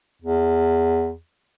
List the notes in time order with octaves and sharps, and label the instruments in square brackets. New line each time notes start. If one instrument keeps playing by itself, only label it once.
[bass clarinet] E2